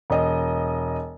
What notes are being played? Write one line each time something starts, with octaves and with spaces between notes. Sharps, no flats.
E1 D#5